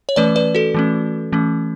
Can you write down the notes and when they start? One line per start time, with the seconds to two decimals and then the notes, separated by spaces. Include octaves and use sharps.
0.09 C#5
0.16 E3 A3 C#4 B4 D5
0.36 B4 D5
0.55 F#4 A4
0.74 E3 A3 C#4
1.32 E3 A3 C#4